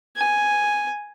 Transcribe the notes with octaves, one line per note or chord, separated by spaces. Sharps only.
G#5